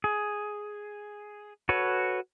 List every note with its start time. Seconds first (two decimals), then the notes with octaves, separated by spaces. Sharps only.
0.04 G#4
1.69 F#4 A4 B4 C#5